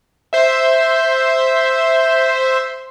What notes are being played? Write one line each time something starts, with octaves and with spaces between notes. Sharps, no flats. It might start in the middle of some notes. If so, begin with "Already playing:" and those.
C5 E5